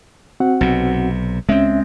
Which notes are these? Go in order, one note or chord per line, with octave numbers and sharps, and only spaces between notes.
C4 F#4 F#5
B1 C3
C#2 G#3 C4 C#4 E5